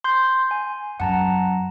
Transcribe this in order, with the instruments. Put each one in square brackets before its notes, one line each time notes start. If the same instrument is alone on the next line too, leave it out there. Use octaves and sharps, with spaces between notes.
[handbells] C6 G6
G#5
[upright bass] F#2 [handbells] F#5 A5 A#5